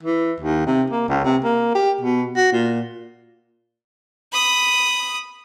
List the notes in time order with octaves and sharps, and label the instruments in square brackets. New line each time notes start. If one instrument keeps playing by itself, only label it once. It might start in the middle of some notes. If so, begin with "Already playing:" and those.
[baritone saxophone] E3
D#2
C3
A#3
C#2
C3
A#3
G4
B2
F#4
A#2
[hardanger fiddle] B5 D#6